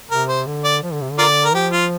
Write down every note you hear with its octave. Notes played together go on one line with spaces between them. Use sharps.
C3 A#4
C5
D3
D5
F3
D3
C3
D3
F4 A#4 D5
A#4
F3 G4
F4